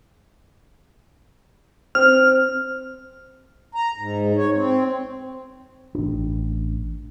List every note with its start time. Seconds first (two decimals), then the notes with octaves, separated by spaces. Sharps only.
1.95 C4 F6
3.75 A#5
3.97 G#2
4.36 C#5
4.55 C4
5.95 A1 D4